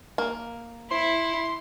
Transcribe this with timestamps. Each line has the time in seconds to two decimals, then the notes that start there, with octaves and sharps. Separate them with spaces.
0.18 A#3
0.91 E4 C6